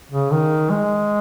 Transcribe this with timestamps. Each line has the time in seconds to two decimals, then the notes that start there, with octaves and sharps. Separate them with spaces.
0.11 C#3
0.31 D#3
0.70 G#3